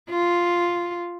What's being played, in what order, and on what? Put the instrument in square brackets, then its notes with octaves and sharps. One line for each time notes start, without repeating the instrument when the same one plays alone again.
[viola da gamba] F4